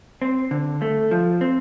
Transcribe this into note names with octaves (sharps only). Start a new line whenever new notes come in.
C4
D3
A3
F3
C4